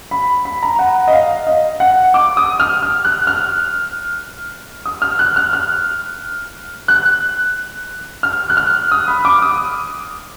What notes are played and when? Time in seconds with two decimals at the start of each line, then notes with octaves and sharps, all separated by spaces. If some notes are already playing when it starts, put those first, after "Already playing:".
0.11 B5
0.45 B5
0.63 A#5
0.79 F#5
1.07 D#5
1.13 F5
1.47 D#5
1.80 F#5
2.14 D6
2.37 D#6
2.60 F6
2.83 F6
3.05 F#6
3.27 F6
4.86 D#6
5.02 F6
5.19 F#6
5.36 F6
5.53 F6
6.88 F#6
8.23 F6
8.50 F#6
8.57 F6
8.92 D#6
9.08 B5
9.25 D6
9.42 D#6